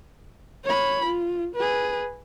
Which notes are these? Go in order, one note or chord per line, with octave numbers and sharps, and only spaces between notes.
C#5 B5
F4
G#4 B4